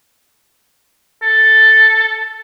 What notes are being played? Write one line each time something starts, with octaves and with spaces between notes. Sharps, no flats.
A4